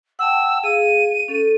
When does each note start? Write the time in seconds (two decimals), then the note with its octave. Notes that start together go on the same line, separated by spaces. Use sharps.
0.19 F#5 G5 A5 E6
0.63 G#4 F5 D#7
1.28 C#4 A4